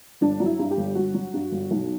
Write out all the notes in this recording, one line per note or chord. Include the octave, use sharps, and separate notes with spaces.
G1 D4
F#3
E4
G2
G4
G1
G1 F#4
F#3
G2
G1
B1